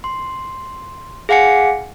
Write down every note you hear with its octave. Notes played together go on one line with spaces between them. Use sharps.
C6
G#4 F5 F#5 G#5 C#7